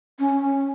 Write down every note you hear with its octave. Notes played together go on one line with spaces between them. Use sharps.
C#4